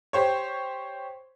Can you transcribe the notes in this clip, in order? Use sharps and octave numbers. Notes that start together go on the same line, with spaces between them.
G4 C5 C#5